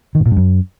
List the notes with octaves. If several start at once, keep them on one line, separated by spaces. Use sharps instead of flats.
D#3
A2
A#2
G2
F#2